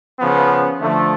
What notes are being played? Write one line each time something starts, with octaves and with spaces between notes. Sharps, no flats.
C#3 F3 B3
D3 F3 A3